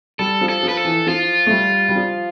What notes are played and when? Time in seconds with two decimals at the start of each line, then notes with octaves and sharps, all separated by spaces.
0.19 G3 A4
0.41 F3
0.49 A4
0.63 F3
0.68 B4
0.77 A4
0.85 E3
1.07 F3 F4
1.47 A3
1.51 G3
1.89 G3
1.96 F3